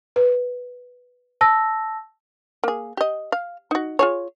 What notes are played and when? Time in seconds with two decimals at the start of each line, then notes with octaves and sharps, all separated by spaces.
0.16 B4
1.41 A5 E6 A#6
2.64 A#3 G#4
2.97 G4 D#5
3.32 F5
3.71 D#4 F#4
3.99 F4 G#4 C#5